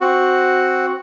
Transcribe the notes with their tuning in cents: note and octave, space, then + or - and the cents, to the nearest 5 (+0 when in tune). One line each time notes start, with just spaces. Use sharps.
C4 +5 F#4 +0